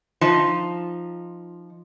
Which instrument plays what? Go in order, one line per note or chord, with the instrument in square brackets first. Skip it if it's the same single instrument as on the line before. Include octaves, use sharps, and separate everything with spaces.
[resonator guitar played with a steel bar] F3 D#4